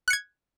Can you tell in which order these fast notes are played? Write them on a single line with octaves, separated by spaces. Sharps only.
F#6 C#7 G#6